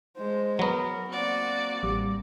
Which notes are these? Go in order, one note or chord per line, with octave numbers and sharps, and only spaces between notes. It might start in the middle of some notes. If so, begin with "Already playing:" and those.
G#3 C5
F#3 B3 A#4
A#3 C4 F#4 D5
A1 G3 D6